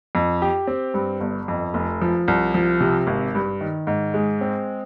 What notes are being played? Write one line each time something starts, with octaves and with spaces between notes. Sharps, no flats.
F2
G4
C4
G2
G1
F2
F1
F3
C2
F3
C3
G#1
G2
D#3
G#2
G#3
C4